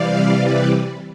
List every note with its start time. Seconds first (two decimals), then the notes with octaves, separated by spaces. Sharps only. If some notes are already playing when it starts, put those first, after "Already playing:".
Already playing: C3 E3 G3 D5 F5
0.34 B4 D5